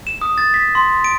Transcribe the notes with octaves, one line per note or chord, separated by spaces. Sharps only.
E7
D#6
A6
B6
C6
D7